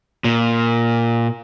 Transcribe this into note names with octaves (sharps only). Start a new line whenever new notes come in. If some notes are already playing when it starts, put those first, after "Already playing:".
A#2